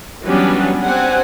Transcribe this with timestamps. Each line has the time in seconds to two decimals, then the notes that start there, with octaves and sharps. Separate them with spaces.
0.24 E3 F#3 G3 B3 C#4 D4
0.83 C4 D4 G4 F#5 G#5